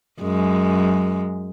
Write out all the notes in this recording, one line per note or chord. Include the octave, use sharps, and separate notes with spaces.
F#2 G#3